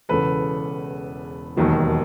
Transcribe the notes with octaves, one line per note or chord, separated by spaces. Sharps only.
E1 E2 C#3 A4 B4
E1 D#2 D#3 F#3